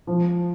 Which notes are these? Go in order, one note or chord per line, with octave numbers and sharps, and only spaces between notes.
F3